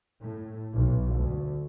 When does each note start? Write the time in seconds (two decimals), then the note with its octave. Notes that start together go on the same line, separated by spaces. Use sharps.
0.20 A2
0.73 B1
1.17 D2